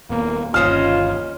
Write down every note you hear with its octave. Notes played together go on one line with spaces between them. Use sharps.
D#1 A#2 A#3 B3
G1 D#2 C#4 F4 C5 D#5 F6